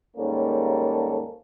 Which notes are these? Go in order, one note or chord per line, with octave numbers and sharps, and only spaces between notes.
D#2 G#2 G3 A#3 C#4 A4